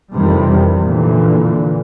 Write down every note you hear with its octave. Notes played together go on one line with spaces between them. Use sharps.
F2 C3 D#3 E3 G3
A#2 D3 E3